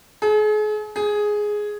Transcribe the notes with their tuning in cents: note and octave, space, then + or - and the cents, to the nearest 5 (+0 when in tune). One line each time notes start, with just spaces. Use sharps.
G#4 +40
G#4 +5